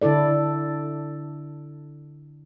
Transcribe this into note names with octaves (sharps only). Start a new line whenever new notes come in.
D3 D4 E4 A4 D5